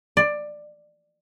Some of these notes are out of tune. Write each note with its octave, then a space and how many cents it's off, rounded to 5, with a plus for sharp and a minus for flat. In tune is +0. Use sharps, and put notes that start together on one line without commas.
D5 +15